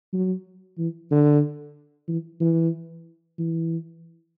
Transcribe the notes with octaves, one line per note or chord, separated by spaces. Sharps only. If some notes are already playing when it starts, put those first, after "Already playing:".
F#3
E3
D3
E3
E3
E3